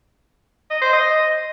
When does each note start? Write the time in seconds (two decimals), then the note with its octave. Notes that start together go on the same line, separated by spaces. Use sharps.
0.70 D#5
0.82 C5
0.93 D#5